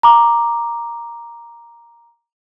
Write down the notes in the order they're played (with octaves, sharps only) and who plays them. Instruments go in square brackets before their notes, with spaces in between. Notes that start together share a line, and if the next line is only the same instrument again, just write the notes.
[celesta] A#5 D6